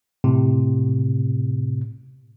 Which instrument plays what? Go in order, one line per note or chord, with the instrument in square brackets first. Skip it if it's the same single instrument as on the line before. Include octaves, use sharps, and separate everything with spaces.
[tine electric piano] A2 C3